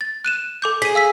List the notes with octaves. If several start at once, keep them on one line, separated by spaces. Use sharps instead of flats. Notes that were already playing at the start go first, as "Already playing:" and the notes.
A6
F#6 D#7 E7
A4 D6 G6
G#4 B6 D#7
F5 E6 B6